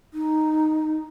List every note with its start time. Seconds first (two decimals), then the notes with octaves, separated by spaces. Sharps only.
0.14 D#4